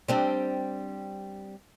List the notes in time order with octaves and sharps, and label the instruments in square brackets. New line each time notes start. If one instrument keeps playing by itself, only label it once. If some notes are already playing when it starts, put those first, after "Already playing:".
[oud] G3 C4 D4